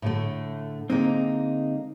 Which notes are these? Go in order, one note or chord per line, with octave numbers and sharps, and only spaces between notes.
A2 D3 A3
D3 G#3 A#3 C4 D#4